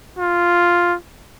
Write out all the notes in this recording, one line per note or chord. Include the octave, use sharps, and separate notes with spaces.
F4